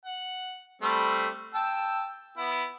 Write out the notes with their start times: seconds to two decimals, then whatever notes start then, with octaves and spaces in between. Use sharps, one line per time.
0.05 F#5
0.82 G3 A3 C4
1.54 G5 A5 E6
2.38 B3 E4